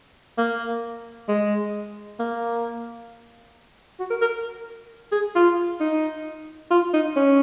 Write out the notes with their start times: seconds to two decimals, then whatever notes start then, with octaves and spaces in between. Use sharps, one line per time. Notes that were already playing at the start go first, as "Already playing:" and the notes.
0.38 A#3
1.28 G#3
2.20 A#3
3.99 F#4
4.10 A#4
4.21 A#4
5.12 G#4
5.36 F4
5.81 D#4
6.71 F4
6.93 D#4
7.16 C#4